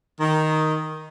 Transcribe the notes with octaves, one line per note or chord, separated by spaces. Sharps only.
D#3